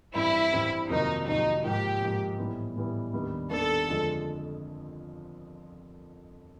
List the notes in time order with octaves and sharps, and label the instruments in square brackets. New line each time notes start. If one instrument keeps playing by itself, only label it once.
[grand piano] G2 E3 G3 C4 [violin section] E4
[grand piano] G2 E3 G3 C4
[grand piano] F2 C3 D#3 F#3 A#3 [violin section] D#4
[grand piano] F2 C3 D#3 F#3 A#3 [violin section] D#4
[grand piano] G#2 F3 A#3 [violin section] G4
[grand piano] G#2 F3 A#3
A2 E3 G3 B3
A2 E3 G3 B3
D#2 D#3 G3 B3 D4
[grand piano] D#2 D#3 G3 B3 D4 [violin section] A4
[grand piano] F2 D3 F3 G#3